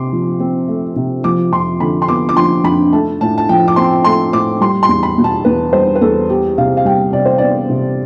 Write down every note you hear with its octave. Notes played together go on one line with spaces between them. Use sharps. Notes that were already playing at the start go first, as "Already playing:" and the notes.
Already playing: C3 C6 D6
F3
C4
A3
C3
F3 D6
F2 C6
D3 B5
C6
B3 D6
D6
F3 C6
F2 B5
A3 A5
A2 A5
A5
F3 G5
D6
C4 C6
A3 C6
A2 D6
G3 C6
C6
E2
B5
B2
A5
E2 B4
G3 C5
B4
E2 A4
B3 G4
C3 F5
F5
G3 G5
C3 D5
C5
B3 D5
C3